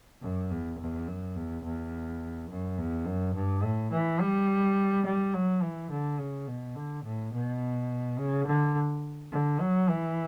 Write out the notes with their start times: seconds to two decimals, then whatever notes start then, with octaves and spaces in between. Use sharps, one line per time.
0.22 F#2
0.51 E2
0.79 E2
1.08 F#2
1.36 E2
1.64 E2
2.50 F#2
2.78 E2
3.06 F#2
3.35 G2
3.64 A2
3.92 E3
4.20 G3
5.06 G3
5.34 F#3
5.62 E3
5.91 D3
6.19 C#3
6.47 B2
6.76 D3
7.04 A2
7.33 B2
8.19 C#3
8.46 D3
9.32 D3
9.60 F#3
9.89 E3